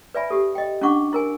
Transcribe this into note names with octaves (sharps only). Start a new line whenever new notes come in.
B4 D5 E5 G#5 B5
G4 A4
D#5 G5
C#4 D4 E4 F#5 C#6 D6
E4 A#4 G#5